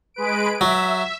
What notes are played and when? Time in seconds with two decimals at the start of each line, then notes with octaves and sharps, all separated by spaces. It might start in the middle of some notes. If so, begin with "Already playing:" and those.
0.14 G#3 B4 D7
0.61 F#3 E5